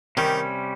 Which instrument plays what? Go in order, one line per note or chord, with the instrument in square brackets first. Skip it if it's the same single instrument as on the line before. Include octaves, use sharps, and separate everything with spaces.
[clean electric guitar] C3 G3 C#4 G4 [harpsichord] D#3